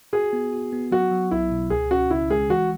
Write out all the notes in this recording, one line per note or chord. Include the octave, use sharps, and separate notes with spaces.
F#4 G#4
B3
F#4
B3
F#3 F#4
F#3
B1 E4
B2
C#2 G#4
C#4 F#4
C#3 E4
G#3 G#4
E3 F#4